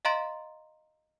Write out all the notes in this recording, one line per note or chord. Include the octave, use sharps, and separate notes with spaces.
D#5 F5 A#5 C6 A6 D7